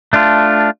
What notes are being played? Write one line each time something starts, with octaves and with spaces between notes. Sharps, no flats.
A3 D4 F4